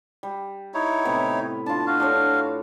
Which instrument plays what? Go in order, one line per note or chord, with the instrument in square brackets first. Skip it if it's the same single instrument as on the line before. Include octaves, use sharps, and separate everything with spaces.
[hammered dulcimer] G3
[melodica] D#4 E4 C#5
[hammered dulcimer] A2 C3 B3
[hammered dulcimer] D4 F4 [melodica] A5
[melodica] F#4 F5
[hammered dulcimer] D4 A4 C#5